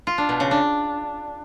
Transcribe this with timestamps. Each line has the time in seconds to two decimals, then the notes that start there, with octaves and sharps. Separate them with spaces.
0.07 F4
0.18 D4
0.29 B2
0.40 C#3
0.51 D4